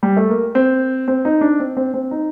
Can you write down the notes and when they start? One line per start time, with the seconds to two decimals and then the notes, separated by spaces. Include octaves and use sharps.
0.03 G3
0.17 A3
0.29 A#3
0.55 C4
1.08 C4
1.25 D#4
1.41 D4
1.60 C4
1.77 C4
1.94 C4
2.11 D#4